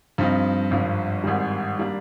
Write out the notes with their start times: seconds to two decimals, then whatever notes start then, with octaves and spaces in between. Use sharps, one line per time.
0.18 G2 F3 C4 D#4
0.71 G#1 G2 F3
1.23 G#1 G#2 D#3 G3
1.79 G3 A#3 D4